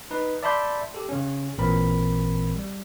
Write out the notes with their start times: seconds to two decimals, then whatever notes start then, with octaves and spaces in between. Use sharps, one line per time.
0.11 D#4 B4
0.43 D5 E5 A5 B5 C6 G6
0.94 G4 A4
1.09 C#3 C#4
1.58 A1 A#2 E3 C4 A#4 B5
2.56 G3